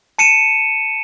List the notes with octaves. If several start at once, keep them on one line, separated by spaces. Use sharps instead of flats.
A5 C#7 D#7 E7